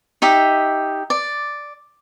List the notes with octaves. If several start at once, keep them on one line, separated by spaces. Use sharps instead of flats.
D#4 G4 E5
D5